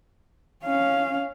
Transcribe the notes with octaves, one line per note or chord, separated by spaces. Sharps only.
C#4 F5